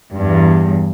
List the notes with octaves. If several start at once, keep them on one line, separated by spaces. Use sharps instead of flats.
E2 G2